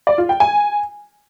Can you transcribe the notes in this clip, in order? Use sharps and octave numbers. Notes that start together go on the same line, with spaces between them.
D5
F4
G5
G#5